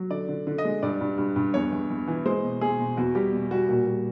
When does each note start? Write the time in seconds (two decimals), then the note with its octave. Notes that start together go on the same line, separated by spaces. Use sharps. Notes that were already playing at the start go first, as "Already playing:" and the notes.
Already playing: F#3
0.10 D3 D5
0.29 D3
0.47 D3
0.58 D#5
0.65 G#3
0.83 G2 D5
1.01 G2
1.18 G2
1.36 G2
1.54 E2 C#5
1.72 E2
1.90 E2
2.08 E3
2.25 G#3 C5
2.43 B2
2.61 B2 G#4
2.79 B2
2.97 E2 F#4
3.15 G3 G4
3.32 B2
3.51 G3 F#4
3.69 A#2 F#4
3.87 G3